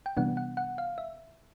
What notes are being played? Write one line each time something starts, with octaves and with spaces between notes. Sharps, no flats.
G5
C3 E3 G3 B3 D4 F#5
F#5
F#5
F5
E5